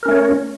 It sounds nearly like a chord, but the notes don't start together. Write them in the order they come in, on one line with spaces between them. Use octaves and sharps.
A#4 C#4 A3 C#5